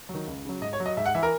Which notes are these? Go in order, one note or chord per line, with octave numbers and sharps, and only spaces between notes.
F#3
D#3
C#2
C#3 F#3
G#2 D#5
C#5
F#3
D#5
G#2 E5
F#5
E3 E5
A#4